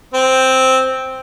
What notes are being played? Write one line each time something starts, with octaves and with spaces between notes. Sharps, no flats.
C4